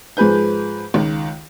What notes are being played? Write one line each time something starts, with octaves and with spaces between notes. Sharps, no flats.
G#2 F3 G#4 B4 G6
C#2 D#3